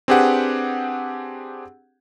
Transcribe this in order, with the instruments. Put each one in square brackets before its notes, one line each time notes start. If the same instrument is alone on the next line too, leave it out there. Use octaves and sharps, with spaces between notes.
[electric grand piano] C4 D4 G4 G#4 B4 F#5